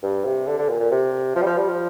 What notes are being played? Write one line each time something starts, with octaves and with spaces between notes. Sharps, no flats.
G2
C3
D3
D3
A#2
A#2
C3
F3
G3
F3
G3
F3